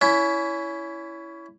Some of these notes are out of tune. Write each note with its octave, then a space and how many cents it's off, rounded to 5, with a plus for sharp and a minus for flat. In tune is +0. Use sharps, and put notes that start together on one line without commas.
C#4 +25 E4 +5